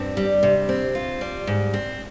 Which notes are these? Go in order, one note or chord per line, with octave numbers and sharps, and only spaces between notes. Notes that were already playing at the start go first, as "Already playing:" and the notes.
Already playing: G2 C4
G3
C3
C4
F4
G3
G#2
C4